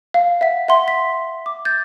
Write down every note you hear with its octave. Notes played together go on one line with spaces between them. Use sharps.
F5
E5 F#5 B6
E5 F#5 C6
B6
D6
G6 A6